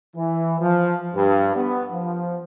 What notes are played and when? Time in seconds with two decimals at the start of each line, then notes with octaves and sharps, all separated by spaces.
0.16 E3
0.59 F3
1.14 G2
1.54 B3
1.92 F3